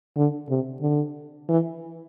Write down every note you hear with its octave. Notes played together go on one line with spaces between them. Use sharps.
D3
C3
D3
E3